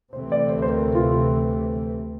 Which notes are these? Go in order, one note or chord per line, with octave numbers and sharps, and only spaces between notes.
D2 C3 E3 A3 C4 C5
D5
C5
C5
A#4
F4